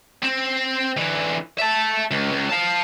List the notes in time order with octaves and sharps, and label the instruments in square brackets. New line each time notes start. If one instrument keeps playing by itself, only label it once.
[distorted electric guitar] C4
D3 E3
E5 A5
C#2
C#2
F5 A5